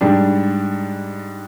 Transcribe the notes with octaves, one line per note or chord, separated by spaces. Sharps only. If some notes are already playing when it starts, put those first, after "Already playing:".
G#2 G3 D4